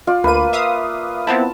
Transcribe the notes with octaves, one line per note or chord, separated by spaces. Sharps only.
F4 D5
D2 A#3 B4 D#7
E5 F5 D#6
B3 C4 E4 A5